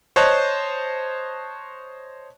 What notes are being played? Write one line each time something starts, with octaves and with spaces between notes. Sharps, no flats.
C5 C#5 D#5 A5 F#6